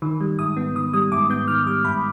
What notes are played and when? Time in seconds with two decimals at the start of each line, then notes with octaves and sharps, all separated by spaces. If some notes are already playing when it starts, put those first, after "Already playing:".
0.02 D#3
0.20 G3
0.39 G#2 D#6
0.57 B3
0.75 D#3 D#6
0.93 G3 D#6
1.11 G#2 D6
1.30 B3 G6
1.48 D#3 F6
1.67 G3 D6
1.84 G#2 B5